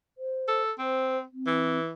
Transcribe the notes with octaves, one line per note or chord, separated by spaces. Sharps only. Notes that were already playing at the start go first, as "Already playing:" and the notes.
C5
A4
C4 C5
C4
E3